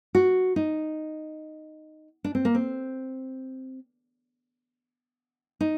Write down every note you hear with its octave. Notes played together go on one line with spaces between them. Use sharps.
F#4
D#4
D4
C4
A#3
C4
D#4